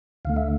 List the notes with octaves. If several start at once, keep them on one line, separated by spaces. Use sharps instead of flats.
D2 D3 A3 F5
E5